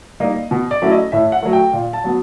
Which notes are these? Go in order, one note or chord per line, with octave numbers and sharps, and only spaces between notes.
G3 A#3 D#4 D#5
B2
D5
F#3 A3 C#4 E4
D#5
A2 E5
F#5
F#3 A3
G5
A#2
A5
F#3 B3